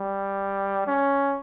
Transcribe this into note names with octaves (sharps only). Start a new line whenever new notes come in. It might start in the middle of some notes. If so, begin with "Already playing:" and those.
Already playing: G3
C#4